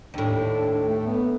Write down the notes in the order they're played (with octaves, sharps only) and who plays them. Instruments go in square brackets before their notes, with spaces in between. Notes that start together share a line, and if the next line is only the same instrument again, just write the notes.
[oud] D#2 A2 [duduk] D4
[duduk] A3
B3